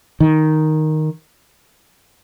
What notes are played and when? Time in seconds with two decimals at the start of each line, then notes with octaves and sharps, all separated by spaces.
0.20 D#3